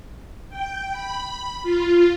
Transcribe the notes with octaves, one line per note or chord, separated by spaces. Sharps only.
G5
B5
F4